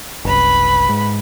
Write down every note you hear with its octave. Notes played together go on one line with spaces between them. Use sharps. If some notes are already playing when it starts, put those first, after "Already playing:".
F#1 C2 B4 B5
G#2